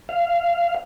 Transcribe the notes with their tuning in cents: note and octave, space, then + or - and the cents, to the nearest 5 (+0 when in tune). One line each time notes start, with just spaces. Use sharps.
F5 -20